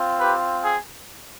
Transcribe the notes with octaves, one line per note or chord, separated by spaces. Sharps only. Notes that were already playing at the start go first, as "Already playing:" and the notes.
Already playing: C4 F4
G4 B4
G#4